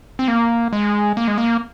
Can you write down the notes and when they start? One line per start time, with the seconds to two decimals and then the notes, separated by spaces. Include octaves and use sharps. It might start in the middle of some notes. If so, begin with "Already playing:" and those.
0.19 C4
0.28 A#3
0.73 G#3
1.17 A#3
1.28 G#3
1.38 A#3